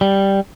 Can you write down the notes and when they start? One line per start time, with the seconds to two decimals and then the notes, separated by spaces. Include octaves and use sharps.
0.01 G3